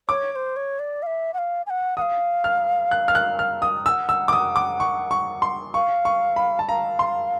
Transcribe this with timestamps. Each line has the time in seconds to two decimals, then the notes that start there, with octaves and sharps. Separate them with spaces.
0.09 C#5 D6
0.32 C#5
0.36 C5
0.56 C#5
0.79 D5
1.03 F5
1.06 E5
1.34 F#5
1.38 F5
1.66 G#5
1.70 F#5
1.97 F#5 D#6
2.01 F5
2.44 F6
2.91 F#6
3.08 F6
3.15 F#6
3.39 F6
3.62 D#6
3.86 G#5 E6
3.90 F#5
4.09 E6
4.28 D6
4.33 D#6
4.56 D6
4.80 C#6
5.11 C#6
5.42 C6
5.74 F5 C#6
6.05 C#6
6.36 B5
6.59 A5
6.68 F5 A#5
6.99 C6